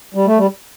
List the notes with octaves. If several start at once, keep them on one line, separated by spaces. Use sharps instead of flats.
G3
A3
G3